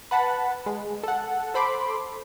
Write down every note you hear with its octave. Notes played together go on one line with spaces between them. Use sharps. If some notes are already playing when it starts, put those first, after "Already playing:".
B4 F#5 A5 B5
G#3
A4 F#5
A4 C5 B5 C6 D6